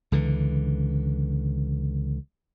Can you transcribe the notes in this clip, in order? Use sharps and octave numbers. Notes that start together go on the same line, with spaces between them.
C#2 D3 E3